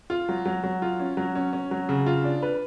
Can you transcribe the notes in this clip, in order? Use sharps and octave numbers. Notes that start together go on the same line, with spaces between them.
F4
F#3
F#3
F#3
F4
C#4
F#3
C#4
C#4
F#3
C#3
F4
D4
B4